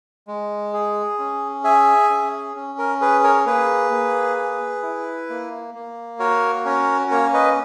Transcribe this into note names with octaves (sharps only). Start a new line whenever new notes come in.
G#3
G#4
C#4
G#4 E5 G#5
C#4
C#4
A#4
G#4 B4
A#4 C#5
A#3 G#4 B4
A#3
G#4
E4
A#3
A#3
F#4 A#4 C#5
C#4 A#4 C#5
A#3 A#4 C#5
B4 D#5